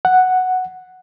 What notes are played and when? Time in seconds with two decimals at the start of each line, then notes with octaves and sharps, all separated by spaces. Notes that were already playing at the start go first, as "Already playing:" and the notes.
0.05 F#5